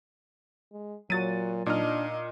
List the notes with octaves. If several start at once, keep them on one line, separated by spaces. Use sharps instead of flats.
G#3
A#2 F#3 F#4 A6 D#7
A#2 D4 D#4 D#5 F6